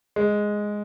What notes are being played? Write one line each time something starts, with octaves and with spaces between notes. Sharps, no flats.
G#3